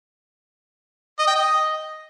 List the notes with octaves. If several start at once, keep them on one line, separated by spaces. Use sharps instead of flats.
D#5
G5
D#5